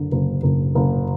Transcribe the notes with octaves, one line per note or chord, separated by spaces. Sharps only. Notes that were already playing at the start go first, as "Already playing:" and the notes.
Already playing: F#1 D3
F#1
F#1
F#1